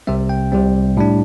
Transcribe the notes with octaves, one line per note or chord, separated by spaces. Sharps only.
C2 C3 G3 C4 E5
G5
C2 C3 G3 C4
A2 G3 D4